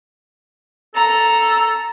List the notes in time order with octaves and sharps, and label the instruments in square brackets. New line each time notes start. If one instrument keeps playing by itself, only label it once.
[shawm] A4 [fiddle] A#5